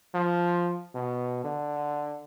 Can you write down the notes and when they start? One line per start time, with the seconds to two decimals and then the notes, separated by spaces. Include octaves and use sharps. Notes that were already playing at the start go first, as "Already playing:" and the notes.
0.14 F3
0.95 B2
1.44 D3